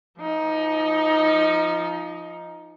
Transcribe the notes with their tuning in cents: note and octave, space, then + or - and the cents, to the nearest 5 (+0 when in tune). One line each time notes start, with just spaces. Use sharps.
F3 -15 D#4 +15